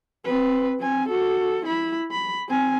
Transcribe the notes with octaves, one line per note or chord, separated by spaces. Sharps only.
C4 B4
C4 G#5
F#4 A4
E4 B5
B5
C4 G#5